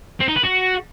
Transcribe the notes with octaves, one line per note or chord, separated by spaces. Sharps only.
C4
D#4
B4
F#4